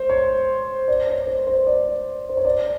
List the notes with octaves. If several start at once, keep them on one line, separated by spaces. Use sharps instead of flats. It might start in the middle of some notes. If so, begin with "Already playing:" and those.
Already playing: C5
C#5
D5
C#5
C5
C5
D5
C5
C#5
D5